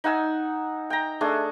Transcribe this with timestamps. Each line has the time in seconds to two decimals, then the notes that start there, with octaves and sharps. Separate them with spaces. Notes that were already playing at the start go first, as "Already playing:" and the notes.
0.04 D#4 F#5 G#5 E6
0.90 G5 A#5
1.21 A3 D4 G#4 A4